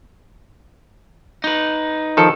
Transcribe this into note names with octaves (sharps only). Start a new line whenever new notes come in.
D#4 B4
D#3 F3 A4